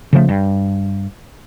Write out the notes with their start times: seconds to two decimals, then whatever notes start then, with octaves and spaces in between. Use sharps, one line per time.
0.13 C#3 F3 A3
0.29 G2